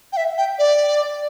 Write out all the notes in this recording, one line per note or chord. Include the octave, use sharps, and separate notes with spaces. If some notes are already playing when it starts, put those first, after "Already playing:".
G5
E5
G5
D5